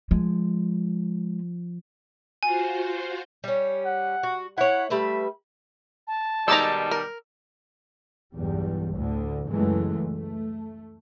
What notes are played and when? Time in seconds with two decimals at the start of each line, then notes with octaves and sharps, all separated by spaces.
0.11 F3 G#3
2.43 F4 F#4 C5 G#5
3.44 G3 C#4
3.86 F#5
4.23 F#4
4.58 E4 C#5 F#5
4.90 G3 A3 B4 E5
6.07 A5
6.48 B2 D#3 G3 G#3 D#4 A#5 D6 E6
6.91 A#4
8.35 B1 E2 G2 G3
8.94 D2 A2 D3
9.48 C#2 F#2 E3 F#3 G#3 A3
10.13 A3